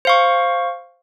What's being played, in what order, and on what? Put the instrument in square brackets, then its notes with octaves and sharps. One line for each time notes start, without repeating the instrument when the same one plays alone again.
[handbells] C5 F5 C#6